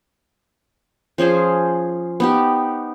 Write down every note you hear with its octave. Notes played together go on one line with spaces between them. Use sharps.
F3 C#4 G#4 C5
B3 D#4 G4